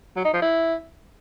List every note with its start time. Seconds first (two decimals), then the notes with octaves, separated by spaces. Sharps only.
0.16 F#3
0.25 D#4
0.33 F3
0.42 E4